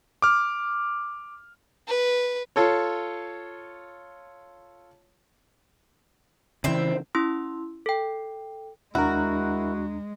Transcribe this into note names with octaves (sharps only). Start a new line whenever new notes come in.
D6 F6
B4
F4 A4 C#5
C#3 E3 C4 C5 E5
C#4 E4 C6 E6
A4 G5
D#2 G#3 D4 E4 F#4 A#4 A#5